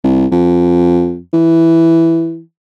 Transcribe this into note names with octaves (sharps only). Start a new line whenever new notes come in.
C2
F2
E3